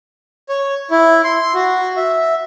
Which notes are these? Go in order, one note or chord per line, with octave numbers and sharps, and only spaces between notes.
C#5
E4
C6
F#4
E5